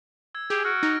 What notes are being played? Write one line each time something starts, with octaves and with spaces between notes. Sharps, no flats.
E6 G#6
G4 G#4 E6
F#4 F6 D7
D#4 A#6